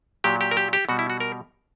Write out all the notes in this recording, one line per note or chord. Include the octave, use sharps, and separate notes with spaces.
A#2 F#3 G4
G4
A#4
G4
G4
B2 G3 F#4
E4
F#4
A#4